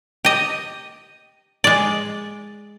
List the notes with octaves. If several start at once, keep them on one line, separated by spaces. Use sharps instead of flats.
G4 D#5
G#3 D5